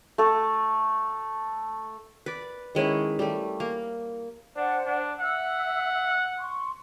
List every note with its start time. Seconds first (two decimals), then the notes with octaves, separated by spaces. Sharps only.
0.18 A3 A4
2.26 B4 D5
2.75 D#3 G#3 C#4 E4
3.19 G3 A3
3.60 A#3
4.56 D4 C5 D5 F#5
4.86 D4
5.20 E5 F#5 E6
6.39 C6 C#6